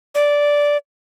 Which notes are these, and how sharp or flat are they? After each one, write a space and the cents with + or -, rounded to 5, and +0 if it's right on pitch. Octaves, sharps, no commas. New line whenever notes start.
D5 -10